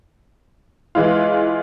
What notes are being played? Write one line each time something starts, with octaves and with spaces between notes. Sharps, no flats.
E3 G#3 E4 F4